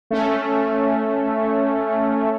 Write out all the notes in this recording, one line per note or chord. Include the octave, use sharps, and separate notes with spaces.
A3 C#4